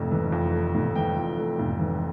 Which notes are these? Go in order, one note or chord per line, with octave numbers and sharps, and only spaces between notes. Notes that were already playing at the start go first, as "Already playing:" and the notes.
Already playing: F1 F2 E3 A3
E3
F2
A3
F1
E3 G5
F2
A3
F1
E3